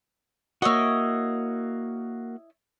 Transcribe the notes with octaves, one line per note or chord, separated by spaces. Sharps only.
A#3 E4 F#4 C#5 D#5